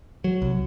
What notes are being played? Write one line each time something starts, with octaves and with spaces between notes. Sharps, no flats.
F#3
C2